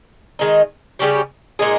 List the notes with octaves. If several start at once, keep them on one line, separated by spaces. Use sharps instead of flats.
D#3 G#3 D#4
C#3 G3 C#4 G4
A#2 G#3 D#4 G#4